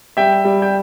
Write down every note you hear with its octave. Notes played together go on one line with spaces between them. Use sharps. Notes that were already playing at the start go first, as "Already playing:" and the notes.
G3 E5 G5
G3
G5